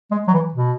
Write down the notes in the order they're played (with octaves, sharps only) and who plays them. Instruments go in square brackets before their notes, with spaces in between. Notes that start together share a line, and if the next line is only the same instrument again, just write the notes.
[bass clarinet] G#3
F#3
E3
B2